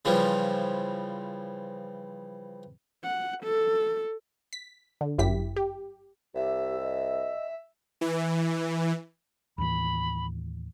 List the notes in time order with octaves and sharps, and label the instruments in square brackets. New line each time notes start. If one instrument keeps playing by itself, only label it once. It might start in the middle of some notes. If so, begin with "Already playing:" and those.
[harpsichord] C#3 E3 F3 G3
[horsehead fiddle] F#5
A4
[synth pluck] B6
D3
G1 F#2 E4 G4 B6
G4
[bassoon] C2 [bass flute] G4 [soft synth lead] E5
[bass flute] D#5
[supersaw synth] E3
[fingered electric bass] D#2 A2 E3 [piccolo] B5